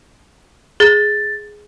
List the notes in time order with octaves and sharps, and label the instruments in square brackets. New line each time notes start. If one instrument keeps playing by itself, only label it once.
[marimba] G#4 [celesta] A6